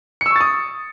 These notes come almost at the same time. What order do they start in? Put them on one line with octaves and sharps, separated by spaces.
C#7 E6 C#6 A6 D#6